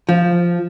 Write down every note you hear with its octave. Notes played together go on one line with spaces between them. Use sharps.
F3